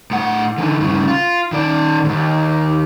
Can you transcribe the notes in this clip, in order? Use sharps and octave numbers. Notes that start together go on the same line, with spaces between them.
A2 F#5
D3 E3
G2 C#3
F4
D#3 D5
D#2 G#2